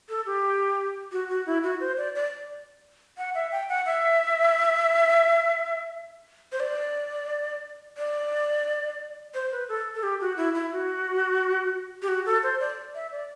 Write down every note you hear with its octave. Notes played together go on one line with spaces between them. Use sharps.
A4
G4
F#4
F#4
E4
F#4
C5
D5
D5
F#5
E5
G5
F#5
E5
C5
D5
D5
C5
B4
A4
A4
G4
F#4
E4
E4
F#4
G4
F#4
A4
C5
D5
E5
D5